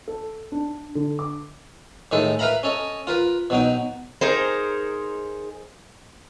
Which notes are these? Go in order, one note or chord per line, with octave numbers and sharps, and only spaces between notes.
A4
D4
D3
D6
A2 D#3 G#3 A4
A#4 B4 E5 F5 A#5 B5
C#4 A4 D#5
F4 A#4 B4
B2 F#3 D#4 G5
D#4 G#4 A#4 C5